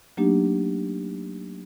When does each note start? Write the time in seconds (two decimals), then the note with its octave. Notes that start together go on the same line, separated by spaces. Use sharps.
0.17 F#3 A3 A#3 D4 D#4 G4